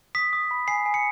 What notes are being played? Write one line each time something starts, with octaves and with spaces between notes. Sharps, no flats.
D#6 B6
D#6
B5
G#5 C7
G#5
C#7